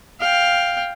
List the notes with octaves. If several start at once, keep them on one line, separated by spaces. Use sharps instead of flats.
F5 G5